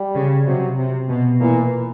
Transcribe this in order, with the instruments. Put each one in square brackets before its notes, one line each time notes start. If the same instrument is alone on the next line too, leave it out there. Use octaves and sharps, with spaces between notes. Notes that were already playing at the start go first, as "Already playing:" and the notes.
Already playing: [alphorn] G3
[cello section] C#3
[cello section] C3 [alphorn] F#3
[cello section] C3
B2
[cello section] A#2 [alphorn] E3